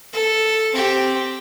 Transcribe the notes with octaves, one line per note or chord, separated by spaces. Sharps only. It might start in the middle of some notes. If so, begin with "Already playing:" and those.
A4
C4 G4